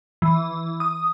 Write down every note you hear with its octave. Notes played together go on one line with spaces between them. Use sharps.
E3
D#6